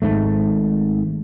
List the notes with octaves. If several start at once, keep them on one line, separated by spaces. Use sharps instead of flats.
G#1 G#2 A3